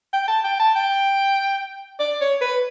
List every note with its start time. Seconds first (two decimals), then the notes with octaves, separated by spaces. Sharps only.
0.13 G5
0.28 A5
0.44 G5
0.59 A5
0.76 G5
1.99 D5
2.21 C#5
2.41 B4